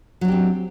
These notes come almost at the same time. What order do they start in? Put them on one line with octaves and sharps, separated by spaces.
F#3 D4 G4 C4